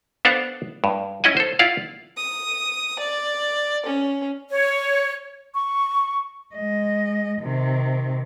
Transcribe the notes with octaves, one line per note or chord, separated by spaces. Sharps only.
B3 D4 A4 C5 F5 F#5
G2
C#4 E4 D#5 F#5 G#5
A4 C5
E4 F4 D5 F5 F#5
D#6
D5
C#4
C#5
C#6
G#3 D#5
C3 D#3